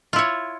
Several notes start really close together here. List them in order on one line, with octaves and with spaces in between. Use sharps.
F4 E4 C#5